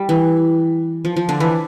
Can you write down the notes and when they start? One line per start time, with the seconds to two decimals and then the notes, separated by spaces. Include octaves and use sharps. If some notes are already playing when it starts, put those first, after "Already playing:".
Already playing: G3
0.09 E3
1.05 F3
1.16 F3
1.29 D3 D4
1.40 E3 E4